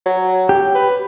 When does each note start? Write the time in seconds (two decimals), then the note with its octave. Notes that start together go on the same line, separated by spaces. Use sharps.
0.06 F#3
0.49 G4
0.74 B4